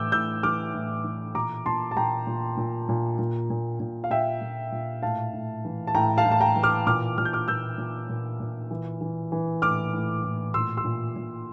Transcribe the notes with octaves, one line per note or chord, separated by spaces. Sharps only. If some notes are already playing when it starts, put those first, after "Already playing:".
Already playing: A2 E3 D6 E6 G6
A2 E6 G6
E3 D6 F6
A2
E3
A#2 A#5 D6
A#2 A5 C6
A5
A#2 G5 A#5
A#2
A#2
A#2
A#2
A#2
A#2
F5
A#2 E5 G5
A#2
A#2
A2 F5 A5
A2
E3
A5
A2 G5 A#5
F5 A5
A2
A5
G5 A#5
E3
D6 F6
A#2 D6 F6
A#2 F6
G6
D6 F6
A#2 E6 G6
A#2
A#2
A#2
E3
E3
E3
A2 D6 F6
A2
A2
A#2 C6 E6
C6 E6
A#2
A#2